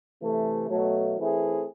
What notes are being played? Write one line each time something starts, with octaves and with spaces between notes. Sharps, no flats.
C3 E3 A3
B2 F#3 A3
E3 A3 C4 E4 G#4